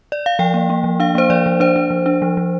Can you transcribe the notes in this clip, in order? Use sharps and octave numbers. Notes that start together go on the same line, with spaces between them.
D5
F5
F3 G5
A#3
A#3
F3
D4 F5
A#3 C5
F3 D5
F3
D4 C5
D4
F3
D4
F3
F3